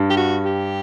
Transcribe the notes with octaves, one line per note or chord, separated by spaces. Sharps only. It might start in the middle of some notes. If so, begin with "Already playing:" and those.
Already playing: G2
G4
F#4
G4